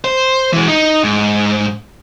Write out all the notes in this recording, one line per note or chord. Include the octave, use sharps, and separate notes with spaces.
C5
E3 G#3
D#4
G#2